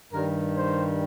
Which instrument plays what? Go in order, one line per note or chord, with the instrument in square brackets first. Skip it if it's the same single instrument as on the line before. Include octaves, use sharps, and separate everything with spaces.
[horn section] G2 D#3 G3 A#4
C5